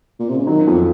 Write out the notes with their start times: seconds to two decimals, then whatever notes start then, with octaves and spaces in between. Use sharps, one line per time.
0.19 A#2
0.29 C3
0.38 C#3
0.46 D#3 F#3
0.67 F2 F3